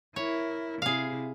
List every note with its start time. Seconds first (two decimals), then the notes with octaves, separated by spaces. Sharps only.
0.16 E4 A#4 C#5
0.82 C3 E4 G#4 F5